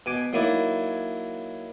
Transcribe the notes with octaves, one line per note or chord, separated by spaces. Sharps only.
B2 G#5 D6
F#3 A#3 D#4 E4 C#5 D5